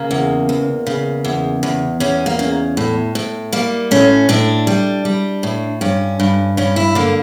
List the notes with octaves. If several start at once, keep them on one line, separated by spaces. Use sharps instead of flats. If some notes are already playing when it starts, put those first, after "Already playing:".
Already playing: C#3 A#3
E2
E2
C#3
E2
E2
E2 C#4
A#3
C#3
A2
A2
G3 A#3
A2 C#4
A2 D4
G3
G3
A2
G2 C#4
G2
G2 C#4
E4
D3 A#3